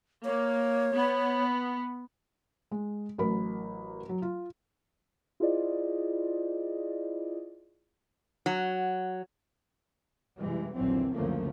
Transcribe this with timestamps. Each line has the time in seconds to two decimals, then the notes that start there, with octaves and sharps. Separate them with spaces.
0.25 A#3 C#5
0.95 B3
2.71 G#3
3.18 A1 F#3 A#4 B5
4.09 F#3
4.22 F4
5.40 E4 F4 G#4 C5 D5 D#5
8.46 F#3
10.40 F#2 C3 E3 G3 G#3
10.73 A#1 D#2 D3 E3 F#3 C4
11.13 C#2 F#2 D3 F3 A3 A#3